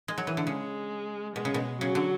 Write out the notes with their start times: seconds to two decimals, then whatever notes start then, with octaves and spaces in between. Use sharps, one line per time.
0.08 G#3
0.18 F#3
0.27 E3
0.37 D3
0.46 C#3 G#3
1.36 B2 G#3
1.45 C#3
1.54 B2
1.81 C#3 F#3
1.95 D3